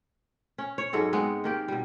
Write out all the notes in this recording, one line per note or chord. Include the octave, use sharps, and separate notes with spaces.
C#4
C#5
G#2 F#3 G#3 A4
G#3 B3 C4
D#3 A#3 G4
B2 G3